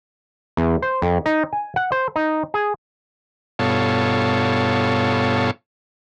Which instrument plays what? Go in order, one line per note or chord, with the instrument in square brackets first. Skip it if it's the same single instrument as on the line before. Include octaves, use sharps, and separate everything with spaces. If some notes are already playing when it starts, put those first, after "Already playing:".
[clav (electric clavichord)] E2
C5
F2
D#4
G#5
F#5
C5
D#4
G#4
[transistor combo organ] G2 B2 F4 A4 C#5